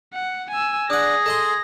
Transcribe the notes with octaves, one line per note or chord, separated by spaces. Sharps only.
F#5
G#5 E6
D4 G#4 F#5 A#6
A4 D#5 C6